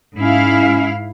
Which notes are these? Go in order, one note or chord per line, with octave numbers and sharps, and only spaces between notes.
G#2 C#4 E4 F5